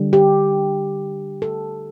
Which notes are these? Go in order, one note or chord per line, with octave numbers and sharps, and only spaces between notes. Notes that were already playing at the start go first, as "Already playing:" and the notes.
Already playing: D3 G3
G4
A4